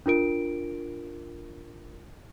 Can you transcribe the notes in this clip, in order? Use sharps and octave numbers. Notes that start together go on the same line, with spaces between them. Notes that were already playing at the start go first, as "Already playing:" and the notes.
D4 F4 A#4 D7